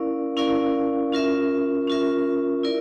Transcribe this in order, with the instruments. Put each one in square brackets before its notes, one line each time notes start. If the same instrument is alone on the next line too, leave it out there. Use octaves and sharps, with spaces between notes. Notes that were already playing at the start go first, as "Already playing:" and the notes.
Already playing: [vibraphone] C#4 E4 A#4 D5 F5
C#4 E4 A#4 D5 F5
C#4 F4 A#4 E5
C#4 F4 A#4 E5
E4 A#4 D5